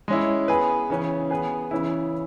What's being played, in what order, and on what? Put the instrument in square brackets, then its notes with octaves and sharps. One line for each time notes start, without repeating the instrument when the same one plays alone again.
[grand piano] G#3 C#4 E4
B3 G#4 B4
C#3 E3 C#4
B3 G#4 B4
C#3 E3 C#4 E4